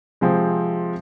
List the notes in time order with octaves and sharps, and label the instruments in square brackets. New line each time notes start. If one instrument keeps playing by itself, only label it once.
[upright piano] C3 F3 G#3 C4